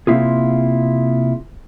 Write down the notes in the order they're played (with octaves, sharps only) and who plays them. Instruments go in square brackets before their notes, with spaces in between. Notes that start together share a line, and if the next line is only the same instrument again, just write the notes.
[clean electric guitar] C3 A#3 C4 E4 F4 G#4